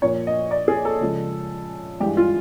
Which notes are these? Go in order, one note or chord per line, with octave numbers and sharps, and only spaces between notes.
A#2 F3 A#3 C#5
D#5
D5
G#4
A4
C#3 F3 G#3
G2 E3 G#3 G4
F4